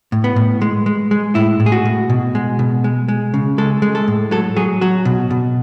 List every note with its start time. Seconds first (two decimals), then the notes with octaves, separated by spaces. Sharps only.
0.12 A2
0.24 B3
0.36 A2
0.62 G#3
0.86 G#3
1.11 G#3
1.35 A2 E4
1.60 A2
1.66 G#4
1.72 F#4
1.85 A2
2.10 B2
2.35 G#3
2.59 B2
2.84 G#3
3.08 G#3
3.34 C#3
3.58 G#3 A4
3.82 G#3
3.95 A4
4.08 A2
4.31 F#3 A4
4.56 F#3 G#4
4.81 F#3 F#4
5.05 B2
5.31 B2